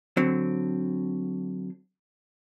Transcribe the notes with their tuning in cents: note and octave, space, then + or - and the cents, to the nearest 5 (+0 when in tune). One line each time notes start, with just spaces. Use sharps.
D3 +0 F#3 +0 C4 +0